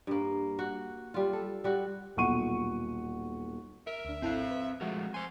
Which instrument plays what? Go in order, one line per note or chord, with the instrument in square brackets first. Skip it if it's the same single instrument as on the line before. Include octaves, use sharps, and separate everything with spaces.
[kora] G2 A#3
F#4
G3 F4
A4
G3 F#4
[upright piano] D#1 B1 F#5 C#6 D#7
[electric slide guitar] A#4 [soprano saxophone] E5
[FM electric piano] D2 D4
[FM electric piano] G#1 E4 A4 [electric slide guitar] C4 C5 F5
[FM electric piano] B4
[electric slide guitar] F3 A3 A#4 [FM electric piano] G#3 [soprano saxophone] F#4
[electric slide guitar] C5 G#5 [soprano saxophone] C6